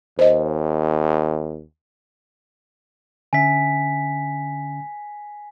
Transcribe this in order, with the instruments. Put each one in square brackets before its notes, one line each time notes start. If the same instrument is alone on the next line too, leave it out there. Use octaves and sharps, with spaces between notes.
[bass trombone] D#2 [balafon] C5 D#5
[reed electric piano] D3 C#4 E5 [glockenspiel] G#5 B6